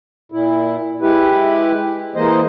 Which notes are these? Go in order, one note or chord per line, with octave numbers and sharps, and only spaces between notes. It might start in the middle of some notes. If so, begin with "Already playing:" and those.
A#2 E4
G#3 E4 G4 B4
E3 G#3 A#3 C5 D#5